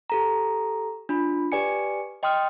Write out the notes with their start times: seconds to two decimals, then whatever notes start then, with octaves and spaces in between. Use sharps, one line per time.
0.10 G4 A4 A#5
1.09 D4 F4 B5
1.52 G4 B4 D5 G#5 C#7
2.23 D#5 G5 C6 D#6 F6